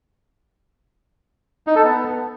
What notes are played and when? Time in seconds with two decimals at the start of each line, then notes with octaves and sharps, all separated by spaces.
1.67 D#4
1.76 A4
1.84 B3